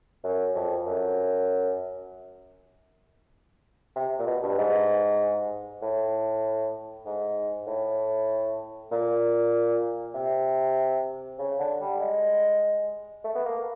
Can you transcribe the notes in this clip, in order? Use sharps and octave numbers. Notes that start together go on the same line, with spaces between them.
F#2
F2
F#2
C3
A#2
B2
G2
G#2
A2
G#2
A2
A#2
C3
C#3
D3
G3
G#3
A3
B3
A#3